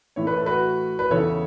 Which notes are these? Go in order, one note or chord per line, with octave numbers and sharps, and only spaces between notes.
A2 E3 A3 C#5
B4
A4
F#4 B4
B4
E2 C#3 E3 A4 C#5